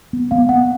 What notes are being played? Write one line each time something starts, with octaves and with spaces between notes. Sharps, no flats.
B3
B3 F5
B3 F#5